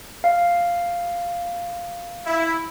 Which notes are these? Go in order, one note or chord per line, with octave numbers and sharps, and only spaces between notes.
F5
E4